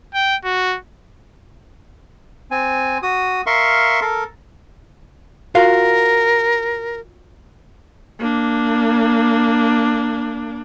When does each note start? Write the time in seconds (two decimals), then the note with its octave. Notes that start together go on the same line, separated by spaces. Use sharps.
0.14 G5
0.45 F#4
2.51 C4 G#5
3.03 F#4 D#6
3.46 A#4 E5 F5 C6 C#6
4.01 A4 A#4
5.55 F4 F#4 A#4 F5
8.19 A#3 D4